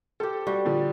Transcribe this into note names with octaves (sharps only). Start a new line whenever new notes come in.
C4 G4 A4
G3 F#4 F#5
A#2 D3 F3